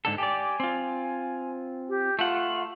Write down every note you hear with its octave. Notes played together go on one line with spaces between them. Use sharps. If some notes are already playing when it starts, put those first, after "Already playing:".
G#2 D3 A4 A5
G4 D5 G#5
C4 F4
G4
A3 F4 F#5